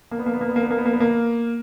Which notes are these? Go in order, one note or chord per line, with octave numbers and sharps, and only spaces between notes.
A#3
B3
A#3
B3
A#3
B3
A#3
B3
A#3
B3
A#3
B3
A#3